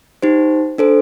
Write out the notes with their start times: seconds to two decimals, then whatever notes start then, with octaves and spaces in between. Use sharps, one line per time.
0.22 D#4 G4 C5
0.78 D4 A4 C5